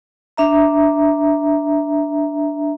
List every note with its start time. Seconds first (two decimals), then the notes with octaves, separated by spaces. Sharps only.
0.37 D4 E5 A#5